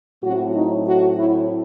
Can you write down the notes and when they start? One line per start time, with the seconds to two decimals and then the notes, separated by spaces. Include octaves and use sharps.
0.23 A2 F#3 A3 C4 F#4
0.55 D#4
0.86 F#4
1.17 E4